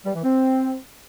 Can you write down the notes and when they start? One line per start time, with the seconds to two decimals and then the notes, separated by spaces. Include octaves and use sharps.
0.05 G3
0.14 E3
0.24 C4